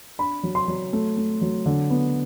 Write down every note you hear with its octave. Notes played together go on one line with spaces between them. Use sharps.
D4 B5
F#3
C6
F#3
A3
A3
F#3
D3
B3